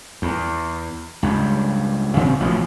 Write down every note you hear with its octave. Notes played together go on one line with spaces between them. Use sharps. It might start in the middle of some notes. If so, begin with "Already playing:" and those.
E2
C#2 G2
C#3 A3 C4
A1 B2 D#3 F3